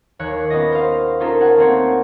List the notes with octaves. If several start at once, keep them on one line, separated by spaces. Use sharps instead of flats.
D#2 C#5 F#6
B3 C#4 F4 D#5 A#6
C5 F5
C#4 D#4 F4 A4 A#4
C5 C#5 F#5 G#5
A3 A#3 C4 C#5